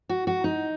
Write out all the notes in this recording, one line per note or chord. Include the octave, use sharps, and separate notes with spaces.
F#4
F#4
D#4